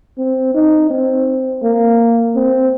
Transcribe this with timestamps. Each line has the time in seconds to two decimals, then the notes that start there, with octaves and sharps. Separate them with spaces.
0.18 C4
0.55 D#4
0.90 C4
1.63 A#3
2.36 C4